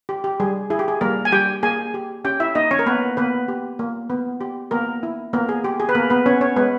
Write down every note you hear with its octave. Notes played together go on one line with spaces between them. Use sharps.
G4
G4
G3 G#4
E4 G#4
G4
G#4
G3 A#3 A#4
G#5
G3 G4 G5
A#3 G#4 G#5
G4
C#4 G4 G5
E4 E5
A#3 D#4 D#5
C#4 C#5
A#4
A#3 B3 B4
A#3 B3 B4
G4
A#3
B3
G4
A#3 B3 A#4
E4
A#3 B3 A#4
G#4
G4
G#4
B4
A#3 B3 A#4
B3 B4
B3 C#4 C#5
C#4 C#5
G#3 B3 B4